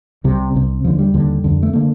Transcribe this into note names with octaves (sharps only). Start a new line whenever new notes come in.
C2 C3 G3
C2 C3
D#2 D3 F3
G3
D#2 D3
F2 D3
A3
D3 A#3